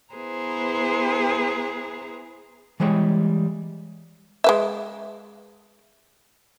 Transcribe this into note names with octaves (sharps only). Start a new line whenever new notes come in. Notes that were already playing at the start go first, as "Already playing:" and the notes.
B3 E4 G#4 B4 C5 A#5
E3 G3 G#3 C#5 G5
G#3 B4 E5